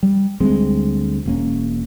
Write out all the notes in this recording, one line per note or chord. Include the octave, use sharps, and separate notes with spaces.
G3
D2 G3 G#3 C4
E1 A#3 C#4